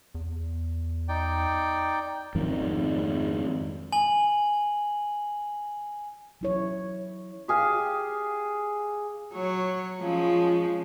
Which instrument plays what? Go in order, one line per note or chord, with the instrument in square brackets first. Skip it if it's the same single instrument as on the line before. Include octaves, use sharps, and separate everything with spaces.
[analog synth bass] E2
[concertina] D#4 D5 G5
[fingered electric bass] F2 G#2 D#3
[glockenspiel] G#5 F#7
[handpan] F#3 E4 C#5
[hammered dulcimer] G4 G#4 F5
[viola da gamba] F#3 C#5
F3 G#3 C#4